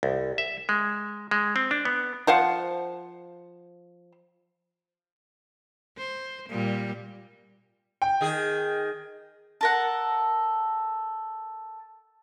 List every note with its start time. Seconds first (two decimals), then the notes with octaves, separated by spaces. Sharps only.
0.03 C2
0.38 E5
0.69 G#3
1.31 G#3
1.56 C4
1.71 D4
1.85 B3
2.27 F3 C5 F5 F#5
5.97 C5
6.49 A#2 G3
8.02 G5
8.21 D#3 G#4
9.61 A4 A#4 F#5